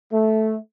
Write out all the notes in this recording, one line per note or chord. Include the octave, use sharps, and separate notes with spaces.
A3